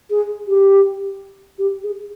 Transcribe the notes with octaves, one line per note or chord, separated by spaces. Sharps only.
G#4
G4
G4
G#4